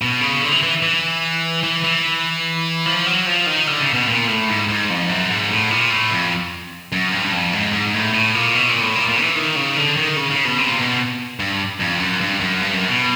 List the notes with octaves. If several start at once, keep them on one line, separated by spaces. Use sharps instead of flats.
B2
C#3
D3
E3
E3
E3
E3
E3
F3
F#3
F3
D#3
D3
C#3
B2
A#2
A2
G#2
G#2
F2
F#2
G#2
A2
A#2
A2
F2
F#2
G2
F2
G#2
G#2
A2
A2
A#2
B2
A#2
A2
A#2
A#2
E3
D#3
C#3
D3
D#3
C#3
C#3
B2
C3
A#2
B2
G2
F2
F#2
G2
F#2
G2
F#2
B2